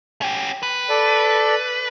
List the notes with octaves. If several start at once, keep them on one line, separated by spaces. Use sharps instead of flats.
C#4 G4
B4
A4 D5